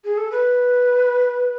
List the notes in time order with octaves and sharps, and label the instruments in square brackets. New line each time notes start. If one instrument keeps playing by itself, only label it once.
[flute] G#4
A4
B4